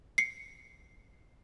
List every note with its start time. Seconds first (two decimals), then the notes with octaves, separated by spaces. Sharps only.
0.18 C7 C#7